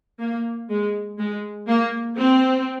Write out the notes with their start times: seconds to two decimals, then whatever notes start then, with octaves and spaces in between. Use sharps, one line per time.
0.20 A#3
0.70 G#3
1.19 G#3
1.68 A#3
2.18 C4